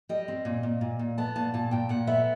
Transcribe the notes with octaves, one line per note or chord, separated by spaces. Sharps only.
G3 D#5
C4
A#2
A#2
A#2
A#2
B3 A5
A#2 A5
A#2 A5
A#2 G5
A#2 F#5
B3 E5